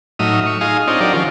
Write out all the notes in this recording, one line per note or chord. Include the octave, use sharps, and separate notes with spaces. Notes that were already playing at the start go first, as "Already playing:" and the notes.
A2 F#3 D#4 E5 D#6 F6
C#6
D#4 F4 G#4 F5 D#6
C4 D4 D#4 F4 C#5 D#5
F#3 D4 G4 A#4 D5
D#3 F3 C#4 F4